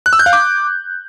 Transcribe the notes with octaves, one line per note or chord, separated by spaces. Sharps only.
F#6
E6
G6
F5
D6